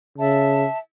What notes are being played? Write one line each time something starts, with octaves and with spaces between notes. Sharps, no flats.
C#3 E5 A5